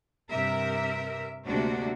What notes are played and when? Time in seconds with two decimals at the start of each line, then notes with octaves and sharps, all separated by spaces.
0.31 G2 C3 A#4 E5
1.46 D2 C3 G#3 A#3 D4 F#4